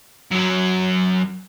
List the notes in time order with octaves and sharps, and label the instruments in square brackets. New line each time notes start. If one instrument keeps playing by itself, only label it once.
[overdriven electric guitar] F#2 F#3